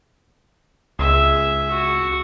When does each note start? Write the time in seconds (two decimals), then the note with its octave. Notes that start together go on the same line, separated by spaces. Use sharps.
0.99 C#2 G#4 E5
1.70 F#4